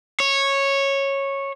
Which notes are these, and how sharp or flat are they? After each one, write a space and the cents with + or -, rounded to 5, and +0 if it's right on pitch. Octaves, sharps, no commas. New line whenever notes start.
C#5 -10